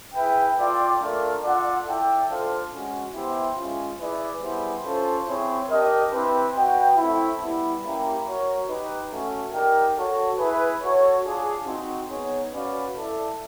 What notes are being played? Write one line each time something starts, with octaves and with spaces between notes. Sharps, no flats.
E4 G#4 B4 E5 G5
F4 A4 D5 G5
A3 D4 F4 A#4 D5
F4 A4 D5 F#5
E4 A4 D5 G5
D4 F4 A4 C5 F5
G#3 C#4 F#4
B3 E4 G4 C5 E5
G#3 C#4 F4
E4 G#4 B4 D5
G3 B3 E4 G#4 C5
C#4 F4 A4 C5
C4 E4 G#4 C#5
D4 G4 A#4 D#5
C4 E4 G4 B4
F#4 B4 D#5 G5
A3 C4 E4
G3 B3 E4
A#3 C#4 E4 G4 A#4
F#4 A#4 C#5
D#4 G4 B4
A3 C#4 F#4
D#4 G4 A#4 D5 G5
F#4 A4 C#5
E4 G#4 B4
F#4 A4 C#5
D4 F4 G#4
C4 D#4 F#4
B3 D#4 G#4 C#5
C#4 F#4 B4 D5 F5
E4 A4 D5